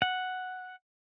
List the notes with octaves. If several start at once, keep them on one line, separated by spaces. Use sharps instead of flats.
F#5